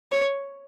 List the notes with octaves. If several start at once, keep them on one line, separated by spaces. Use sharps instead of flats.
C#5